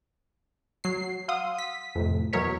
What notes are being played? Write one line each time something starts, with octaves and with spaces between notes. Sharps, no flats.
F#3 C7
F5 F#5 C6 D#6 E6
B6
F2 A2 C3
E2 B2 F#3 A#4 C#5 B6